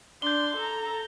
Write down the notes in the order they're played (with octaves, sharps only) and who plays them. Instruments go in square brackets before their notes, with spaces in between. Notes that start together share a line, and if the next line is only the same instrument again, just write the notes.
[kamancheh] D4 C6 [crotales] G6 G7
[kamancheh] A4 A#5